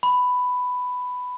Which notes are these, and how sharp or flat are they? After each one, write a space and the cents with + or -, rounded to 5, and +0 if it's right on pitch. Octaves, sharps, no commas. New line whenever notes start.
B5 +10